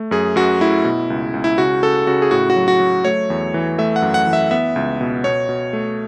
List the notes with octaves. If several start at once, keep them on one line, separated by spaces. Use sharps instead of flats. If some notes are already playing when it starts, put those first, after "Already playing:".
Already playing: A3
F#2 G#4
F#2 F#4
A3 E4
B2
C#2
C#2
E4
C#3 F#4
C#3 A4
C#3 F#4
G#4
A2 F#4
F#4
F#3
F#4
F#3
A3 C#5
E2
E3
A3 E5
F#5
F#2
F#5
E3
E5
B3 E5
C#2
B2
B2 C#5
B2
A3